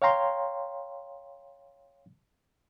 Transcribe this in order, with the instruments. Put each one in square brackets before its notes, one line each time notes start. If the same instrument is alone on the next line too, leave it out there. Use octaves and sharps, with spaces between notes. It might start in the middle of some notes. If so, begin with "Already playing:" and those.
[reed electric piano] C#5 F5 G5 A#5 C6